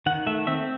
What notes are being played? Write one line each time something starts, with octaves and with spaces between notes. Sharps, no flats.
D#3 F#5
A3 E5
C4 E5